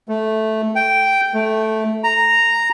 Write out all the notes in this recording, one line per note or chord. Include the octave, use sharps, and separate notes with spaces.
A3
G5
A3
A#5